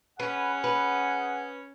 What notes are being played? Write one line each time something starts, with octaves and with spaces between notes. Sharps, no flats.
C#4 G#4 B4 F#5
B4